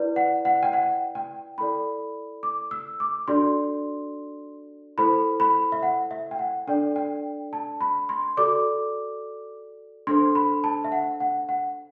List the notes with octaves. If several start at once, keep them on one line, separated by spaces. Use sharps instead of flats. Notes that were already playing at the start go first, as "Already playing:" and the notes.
Already playing: E4 B4 D5
F#5
F#5
G5
F#5
G5
E4 A4 D5 B5
D6
E6
D6
D4 F#4 A4 D5 C6
E4 A4 C5 B5
B5
E5
F#5
E5
G5
F#5
D4 A4 D5 G5
G5
A5
B5
C6
F#4 A4 D5 D6
D4 A4 C5 C6
B5
A5
E5
F#5
F#5
F#5